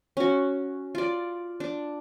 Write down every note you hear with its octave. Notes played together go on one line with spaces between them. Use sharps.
C#4 F#4
F4 D5
D4